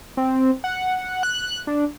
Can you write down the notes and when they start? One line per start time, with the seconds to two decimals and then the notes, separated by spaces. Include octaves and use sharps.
0.17 C4
0.64 F#5
1.23 F#6
1.67 D4